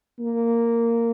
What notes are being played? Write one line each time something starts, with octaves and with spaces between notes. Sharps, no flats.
A#3